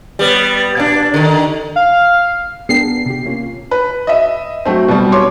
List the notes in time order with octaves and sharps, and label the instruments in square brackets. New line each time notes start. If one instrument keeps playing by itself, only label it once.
[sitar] G3 B3
A#2 D4
D3 D#3
[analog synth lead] F5
[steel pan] B3 D4 [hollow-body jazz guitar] G#4 A#4 G5 [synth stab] C7
[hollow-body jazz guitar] G#4
C3 G4
A#3 C#4 F4
[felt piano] B4
D#5 E5
F#3 A3 C4
B2 G3
C#5 C6 D6